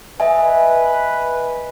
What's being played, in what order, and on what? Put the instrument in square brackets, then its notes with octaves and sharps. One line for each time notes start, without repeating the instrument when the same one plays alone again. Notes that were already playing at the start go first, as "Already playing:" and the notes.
[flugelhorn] B4 [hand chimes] D#5 E5 G#5